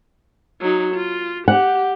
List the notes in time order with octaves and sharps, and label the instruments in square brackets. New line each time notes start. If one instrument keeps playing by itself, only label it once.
[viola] F#3 D#4
F4
[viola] G4 [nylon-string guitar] F#5